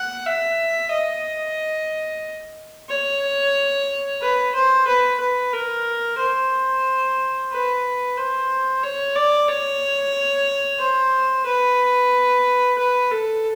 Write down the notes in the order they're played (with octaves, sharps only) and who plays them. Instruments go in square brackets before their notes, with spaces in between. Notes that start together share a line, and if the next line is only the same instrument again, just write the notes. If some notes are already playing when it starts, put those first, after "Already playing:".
Already playing: [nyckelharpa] F#5
E5
D#5
C#5
B4
C5
B4
B4
A#4
C5
B4
C5
C#5
D5
C#5
C5
B4
B4
A4